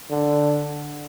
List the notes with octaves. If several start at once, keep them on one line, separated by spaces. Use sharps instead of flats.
D3